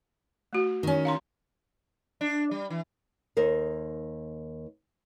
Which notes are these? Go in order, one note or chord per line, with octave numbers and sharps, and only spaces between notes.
A3 F#4
D#3 C#4
F5 A#5 C6
D4
G3
E3
D#2 D#4 A#4 C5